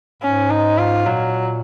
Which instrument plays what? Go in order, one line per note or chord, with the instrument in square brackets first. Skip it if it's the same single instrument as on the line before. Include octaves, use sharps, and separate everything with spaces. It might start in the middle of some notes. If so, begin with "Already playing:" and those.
[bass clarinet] G#2 [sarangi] C#4
[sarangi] D#4
F4
[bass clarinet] A#2 [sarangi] F#3